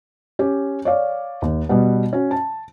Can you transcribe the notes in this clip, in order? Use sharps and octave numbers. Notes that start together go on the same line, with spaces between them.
C#4 G4
C#5 D5 F5
D#2
B2 G3 B3
C#4 F#4
A5